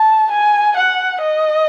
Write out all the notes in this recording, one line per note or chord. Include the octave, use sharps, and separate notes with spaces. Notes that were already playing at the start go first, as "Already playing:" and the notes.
Already playing: A5
G#5
F#5
D#5